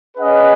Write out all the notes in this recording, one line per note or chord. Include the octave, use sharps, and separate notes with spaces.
C#4 G#4 B4 D#5 F#5